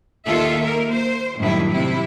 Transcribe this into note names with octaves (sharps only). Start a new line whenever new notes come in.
D#2 D#3 F4 A4 E5
A#3 A#4
C5
F#2 A2 D#3 G3 D4 E4
C3 E4